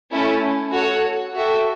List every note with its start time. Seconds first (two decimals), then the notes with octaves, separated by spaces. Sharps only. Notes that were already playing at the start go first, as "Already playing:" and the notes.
0.10 A3 C#4 E4
0.71 F#4 A4 C#5 F#5
1.34 F#4 A4 E5 G5